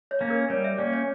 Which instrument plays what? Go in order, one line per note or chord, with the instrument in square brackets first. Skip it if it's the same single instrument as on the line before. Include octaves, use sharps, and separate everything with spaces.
[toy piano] C#5
[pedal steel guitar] A#3 C#4
[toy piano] A#4
[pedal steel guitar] G3 [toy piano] C#5
[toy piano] E5
[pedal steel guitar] A#3 C#4 [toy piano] D5
[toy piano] C#5